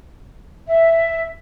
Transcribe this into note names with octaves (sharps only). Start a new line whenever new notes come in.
E5